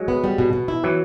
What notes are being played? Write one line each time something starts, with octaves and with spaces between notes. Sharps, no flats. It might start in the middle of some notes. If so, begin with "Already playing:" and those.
Already playing: F#3 G#3
B3
G3
B2
B2
E4
E3 F#3